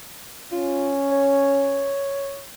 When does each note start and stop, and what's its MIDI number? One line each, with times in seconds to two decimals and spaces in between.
0.52 1.94 61
0.52 0.95 65
1.12 2.42 73